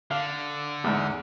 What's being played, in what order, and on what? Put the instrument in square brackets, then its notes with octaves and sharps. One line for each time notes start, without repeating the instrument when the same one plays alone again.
[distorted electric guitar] D3 [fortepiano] F5
[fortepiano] E2 G#2